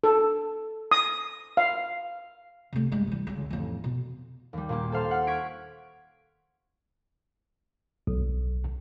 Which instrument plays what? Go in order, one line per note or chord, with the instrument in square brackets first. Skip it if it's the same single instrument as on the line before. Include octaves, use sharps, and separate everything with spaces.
[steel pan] A4
D#6
F5
[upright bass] C3 A3
G2 G#3
E3 G3
C#2 D3
A1 F2
B2
[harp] D#2 G3
A#2 A#3 G4
A4 C5 F5 C6
F#5 F6
C#6 G#6 B6 D7
[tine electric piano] B1